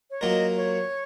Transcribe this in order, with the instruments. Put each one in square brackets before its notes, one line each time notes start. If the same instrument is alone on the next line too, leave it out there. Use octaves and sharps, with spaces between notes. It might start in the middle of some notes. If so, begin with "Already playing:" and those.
[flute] C#5
[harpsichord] F#3 A#3 F4 A#4 [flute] D#5
[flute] C#5